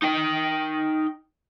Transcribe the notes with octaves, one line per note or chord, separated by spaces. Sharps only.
D#4 G5